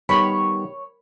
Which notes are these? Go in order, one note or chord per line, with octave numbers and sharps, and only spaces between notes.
D#3 G3 B3 A#4 C#5 B5